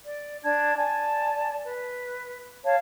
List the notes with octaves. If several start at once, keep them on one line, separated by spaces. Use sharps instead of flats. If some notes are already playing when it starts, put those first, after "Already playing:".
D5
D4 A5 G#6
D5 G#5 A5
B4
C#5 F5 A5